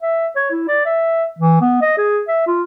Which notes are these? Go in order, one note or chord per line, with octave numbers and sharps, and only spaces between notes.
E5
C#5
E4
D5
E5
E3
B3
D#5
G#4
E5
F4